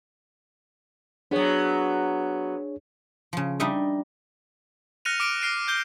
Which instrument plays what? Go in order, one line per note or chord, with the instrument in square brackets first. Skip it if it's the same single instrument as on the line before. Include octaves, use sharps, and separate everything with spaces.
[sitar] F#3 B3 [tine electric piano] D4 G#4 C#5
[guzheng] C#3 F3
G3 D4 D#4 D#5 E5
[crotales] F6 F#6 A#6 C#7 D#7 F7
D6 F6 D7
F6 A#6 C7 D7 D#7
F6 G6 G7